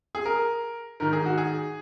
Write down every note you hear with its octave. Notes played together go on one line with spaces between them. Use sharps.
G#4
A#4
G#2 D#3 A#4
G#4
F#4
G#4